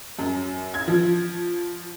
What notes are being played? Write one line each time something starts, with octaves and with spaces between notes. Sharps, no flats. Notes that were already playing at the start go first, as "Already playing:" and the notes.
F#2
G#6
F3